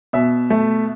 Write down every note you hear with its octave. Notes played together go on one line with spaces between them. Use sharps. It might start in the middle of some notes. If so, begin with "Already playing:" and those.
B2 E5
A3